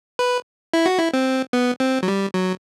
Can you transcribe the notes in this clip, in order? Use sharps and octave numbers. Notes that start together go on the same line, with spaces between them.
B4
E4
F#4
E4
C4
B3
C4
F#3
G3
F#3